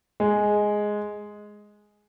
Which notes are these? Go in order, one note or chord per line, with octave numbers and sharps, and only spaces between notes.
G#3